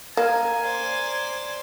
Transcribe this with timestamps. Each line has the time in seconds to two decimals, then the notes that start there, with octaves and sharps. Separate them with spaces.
0.17 A#3 G#5 A#5 F6
0.63 C5 D5